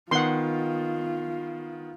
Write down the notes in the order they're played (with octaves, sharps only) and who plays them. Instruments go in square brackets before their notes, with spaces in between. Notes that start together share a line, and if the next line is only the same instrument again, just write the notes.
[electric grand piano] D#3 B3 [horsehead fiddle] F4 [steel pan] F#5 C6